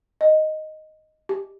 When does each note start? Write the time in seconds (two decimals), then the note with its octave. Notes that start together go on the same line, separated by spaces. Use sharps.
0.21 D#5
1.29 G4